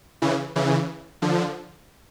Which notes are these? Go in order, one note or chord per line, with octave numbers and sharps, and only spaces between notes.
C#3 E3
C#3 E3
D3 F3